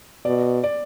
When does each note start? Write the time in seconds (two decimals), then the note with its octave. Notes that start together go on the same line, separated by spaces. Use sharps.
0.25 B2 D5
0.64 D5